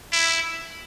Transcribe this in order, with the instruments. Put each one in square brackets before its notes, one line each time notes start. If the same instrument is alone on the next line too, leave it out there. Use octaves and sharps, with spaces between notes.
[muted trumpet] E4